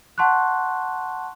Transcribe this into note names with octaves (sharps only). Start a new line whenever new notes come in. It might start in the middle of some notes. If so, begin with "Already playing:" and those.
F#5 A5 C6 C#6 F#6